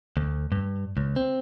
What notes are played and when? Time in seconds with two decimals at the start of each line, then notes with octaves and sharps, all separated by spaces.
0.17 D2
0.52 G2
0.97 C#2
1.16 C4